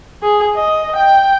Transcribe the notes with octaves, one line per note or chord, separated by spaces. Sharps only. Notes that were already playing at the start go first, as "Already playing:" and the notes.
G#4
D#5
G5